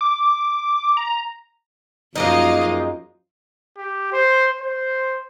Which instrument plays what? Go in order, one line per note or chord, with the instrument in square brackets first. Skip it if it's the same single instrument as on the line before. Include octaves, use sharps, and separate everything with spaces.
[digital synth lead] D6
A#5
[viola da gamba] F#2 F3 F4 [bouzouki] G#3 A#3 D#4 [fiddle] D#5 F5
[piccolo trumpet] G4
C5
C5